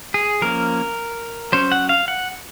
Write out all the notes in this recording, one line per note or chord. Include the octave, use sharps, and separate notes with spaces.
G#4
F3 A#3 C#4 A#4
F#3 C#4 C5
F#5
F5
F#5